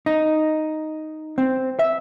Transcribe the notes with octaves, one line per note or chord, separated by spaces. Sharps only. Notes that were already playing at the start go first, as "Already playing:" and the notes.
D#4
C4
E5